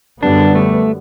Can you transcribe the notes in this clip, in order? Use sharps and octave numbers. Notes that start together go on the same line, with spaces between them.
F#2 D3 G3 B3 D4
A3